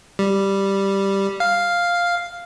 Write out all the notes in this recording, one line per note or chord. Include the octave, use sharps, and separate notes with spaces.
G3
F5